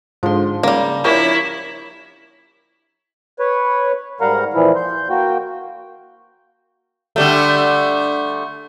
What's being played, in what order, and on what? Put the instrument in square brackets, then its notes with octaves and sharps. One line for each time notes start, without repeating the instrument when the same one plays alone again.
[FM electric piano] G#2 D3 [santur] F3 C6
[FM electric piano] C#3 [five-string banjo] G3 A#3
[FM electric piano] F3 C#4 D4 [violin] E4 [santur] G4 A#4 C#5
[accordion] B4 C#5
G#2 G3 A#4 F5 F#5 A#5
A#2 E3 F3 E4
C6 G6
A#3 F#4 G5
[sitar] D3 G3 A3